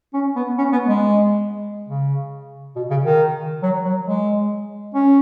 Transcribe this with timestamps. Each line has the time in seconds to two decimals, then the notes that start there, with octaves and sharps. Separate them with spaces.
0.14 C#4
0.36 B3
0.59 C#4
0.72 B3
0.87 G#3
1.89 C#3
2.76 B2
2.90 C#3
3.05 D#3
3.63 F#3
3.85 F#3
4.06 G#3
4.94 C#4